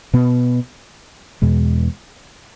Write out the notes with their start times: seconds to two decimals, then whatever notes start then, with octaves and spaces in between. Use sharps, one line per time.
0.14 B2 B3
1.42 E2 B2 G#3